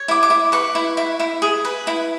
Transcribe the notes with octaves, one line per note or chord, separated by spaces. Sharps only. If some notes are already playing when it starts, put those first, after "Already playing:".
Already playing: C#5
E4 D6
D6
E4
B4 C#6
E4
E4
E4
G#4
B4
E4